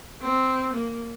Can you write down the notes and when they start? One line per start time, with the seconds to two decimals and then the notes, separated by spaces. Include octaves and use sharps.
0.22 C4
0.74 A#3